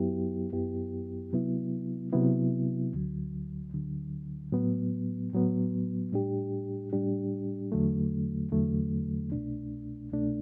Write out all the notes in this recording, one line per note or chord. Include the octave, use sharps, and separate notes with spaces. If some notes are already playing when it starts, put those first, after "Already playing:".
Already playing: F#2 F#3 B3 E4 G4
F#2 F#3 B3 E4 G4
C3 F#3 B3 E4
C3 F#3 B3 E4
D2 D3 F#3
D2 D3 F#3
A2 F#3 B3
A2 F#3 B3
A2 G3 D4 G4
A2 G3 D4 G4
E2 D3 F#3 A3
E2 D3 F#3 A3
C2 B2 A3 D4
C2 B2 A3 D4